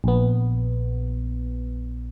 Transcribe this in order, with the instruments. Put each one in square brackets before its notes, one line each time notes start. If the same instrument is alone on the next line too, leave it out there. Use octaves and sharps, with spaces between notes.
[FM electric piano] A#1 B3